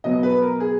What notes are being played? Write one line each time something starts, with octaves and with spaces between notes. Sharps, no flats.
B2 F#3 B3 D#5
B4
A#4
G#4